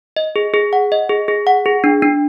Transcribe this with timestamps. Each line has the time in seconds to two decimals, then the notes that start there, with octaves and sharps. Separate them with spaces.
0.17 D#5
0.36 G#4
0.54 G#4
0.73 F#5
0.92 D#5
1.09 G#4
1.28 G#4
1.47 F#5
1.66 G#4
1.84 D4
2.02 D4